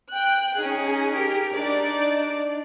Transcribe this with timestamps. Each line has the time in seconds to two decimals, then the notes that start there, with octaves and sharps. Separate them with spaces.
0.11 G5 F#6
0.58 C#4 D#4 G#4
1.14 G4 A#4
1.55 D4 D#4 D5